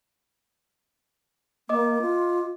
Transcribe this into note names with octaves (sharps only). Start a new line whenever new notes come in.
A#3 D#5 D6
F4